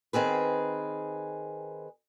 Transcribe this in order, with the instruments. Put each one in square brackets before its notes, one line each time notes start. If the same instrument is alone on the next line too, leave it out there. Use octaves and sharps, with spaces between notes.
[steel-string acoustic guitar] D#3 C4 G#4 B4